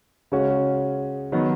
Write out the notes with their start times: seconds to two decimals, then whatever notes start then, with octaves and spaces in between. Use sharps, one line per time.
0.32 C#3 G#3 C#4 F#4
1.32 D#3 F#3 B3